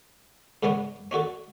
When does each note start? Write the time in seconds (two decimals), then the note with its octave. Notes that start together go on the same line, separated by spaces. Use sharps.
0.63 G#2 C#3 B3 C#4 D4
1.11 C#4 D4 F#4 A4